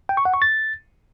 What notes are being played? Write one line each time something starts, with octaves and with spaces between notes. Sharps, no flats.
G5
C#6
F#5
C#6
A6